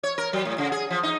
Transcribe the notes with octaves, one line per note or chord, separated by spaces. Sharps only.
C#5
A#4
F#3
A2
C#3
G#4
F3
D#4